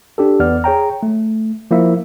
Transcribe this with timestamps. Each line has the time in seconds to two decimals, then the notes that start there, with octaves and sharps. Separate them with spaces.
0.18 D4 G4 A4
0.40 E2 B3 D5 F6
0.64 G#4 C#5 G5 A#5
1.03 A3
1.71 F3 A#3 E4 E5